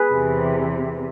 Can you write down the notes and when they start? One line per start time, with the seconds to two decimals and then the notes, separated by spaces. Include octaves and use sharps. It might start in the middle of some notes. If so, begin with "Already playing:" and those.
Already playing: G#4 B4
0.09 E2 C3 E3